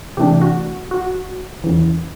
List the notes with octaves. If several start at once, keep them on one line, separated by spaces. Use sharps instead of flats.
C3 E3 A3 D4 G4
F#4
F#4
E2 C#3 E3